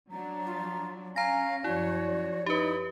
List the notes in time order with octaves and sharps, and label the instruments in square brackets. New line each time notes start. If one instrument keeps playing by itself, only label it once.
[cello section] F#3 D4 [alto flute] A#5
[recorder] F4
[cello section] C#4 [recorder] F5 [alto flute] G#5 [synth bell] A#5 A#6
[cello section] F#2 F3 C#5 [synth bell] E4 [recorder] F#4 [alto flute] D5
[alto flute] D#4 [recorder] E4 [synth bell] G4 B4